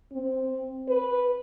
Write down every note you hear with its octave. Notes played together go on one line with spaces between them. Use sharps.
C4
B4